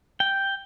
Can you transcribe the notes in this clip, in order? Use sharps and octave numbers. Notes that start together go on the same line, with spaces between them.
G5